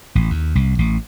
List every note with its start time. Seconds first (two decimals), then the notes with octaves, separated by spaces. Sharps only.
0.15 A1
0.30 D#2
0.55 C2
0.79 A1